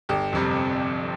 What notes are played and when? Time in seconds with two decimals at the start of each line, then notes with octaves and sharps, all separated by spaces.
0.09 G1 G4
0.33 F2 C3 G3